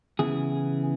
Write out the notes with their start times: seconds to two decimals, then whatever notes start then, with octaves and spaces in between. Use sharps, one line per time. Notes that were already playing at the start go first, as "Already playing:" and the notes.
0.19 C#3 E3 B3 E4 G#4